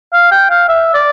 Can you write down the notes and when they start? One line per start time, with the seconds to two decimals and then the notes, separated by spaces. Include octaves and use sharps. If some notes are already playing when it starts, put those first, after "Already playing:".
0.13 F5
0.31 G5
0.50 F5
0.69 E5
0.94 D5